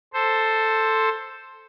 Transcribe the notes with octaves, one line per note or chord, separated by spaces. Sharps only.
A4 C5